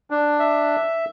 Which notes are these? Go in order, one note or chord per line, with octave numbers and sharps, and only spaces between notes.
D4
E5